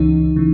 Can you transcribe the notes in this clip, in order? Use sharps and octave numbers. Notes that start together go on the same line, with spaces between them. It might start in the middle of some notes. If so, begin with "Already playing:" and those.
Already playing: C#2 C#3 E3 D#4
C#3 E3